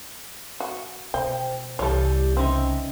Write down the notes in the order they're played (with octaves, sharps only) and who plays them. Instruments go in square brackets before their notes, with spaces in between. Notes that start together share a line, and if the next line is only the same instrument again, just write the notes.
[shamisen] F#4
[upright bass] B2 [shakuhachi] C5 [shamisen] G5
[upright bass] C2 [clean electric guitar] E3 G3 [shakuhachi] G4 [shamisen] A4 C#5
[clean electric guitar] C#3 D#4 E5 [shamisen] C4 [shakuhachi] C#4